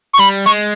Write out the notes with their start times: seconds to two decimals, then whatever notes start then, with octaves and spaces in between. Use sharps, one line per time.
0.14 C#6
0.19 G3 B5
0.46 G#3 C#6